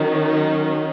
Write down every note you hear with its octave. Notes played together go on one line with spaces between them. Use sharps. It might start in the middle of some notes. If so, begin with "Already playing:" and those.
Already playing: D#3 F#3 C#4
D#4